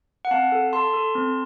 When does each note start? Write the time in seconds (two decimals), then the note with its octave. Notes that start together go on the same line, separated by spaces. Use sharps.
0.25 F#5
0.31 C4 F5 A5
0.52 A4
0.72 A4 A5 C6
0.93 A4
1.15 C4